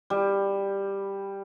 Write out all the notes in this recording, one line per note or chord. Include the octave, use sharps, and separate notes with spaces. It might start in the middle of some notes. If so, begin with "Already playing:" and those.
G3